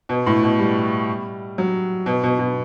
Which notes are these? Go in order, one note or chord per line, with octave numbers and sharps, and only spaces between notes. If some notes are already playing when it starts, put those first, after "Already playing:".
B2
A2
B2
G3
F#3
B2
B2
B2